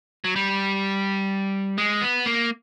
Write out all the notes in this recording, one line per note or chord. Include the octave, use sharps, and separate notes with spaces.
F#3
G3
G#3
B3
A#3